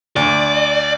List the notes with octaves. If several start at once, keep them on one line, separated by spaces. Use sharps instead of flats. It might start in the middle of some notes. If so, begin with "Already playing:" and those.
D2 D5